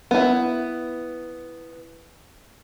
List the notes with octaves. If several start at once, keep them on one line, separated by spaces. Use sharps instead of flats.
B3 E4